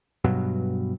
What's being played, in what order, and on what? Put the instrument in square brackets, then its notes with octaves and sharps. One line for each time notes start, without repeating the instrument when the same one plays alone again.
[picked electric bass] G2 B2 F#3